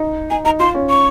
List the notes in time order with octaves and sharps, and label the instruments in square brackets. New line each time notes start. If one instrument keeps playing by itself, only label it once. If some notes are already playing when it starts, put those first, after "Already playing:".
Already playing: [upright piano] D#4
[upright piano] D#4 [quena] G#5
[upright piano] D#4 [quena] A#5
[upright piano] F4 [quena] C6
[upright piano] C#4
[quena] C#6